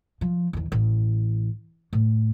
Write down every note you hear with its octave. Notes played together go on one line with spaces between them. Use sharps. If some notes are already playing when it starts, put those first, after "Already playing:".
F3
E2 D#3
A1
A2